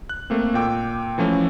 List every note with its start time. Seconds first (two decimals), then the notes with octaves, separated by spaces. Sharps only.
0.09 F#6
0.30 A3 A#3 C4
0.54 A#2 G5 D6 E6
1.18 E3 F3 A3 C#4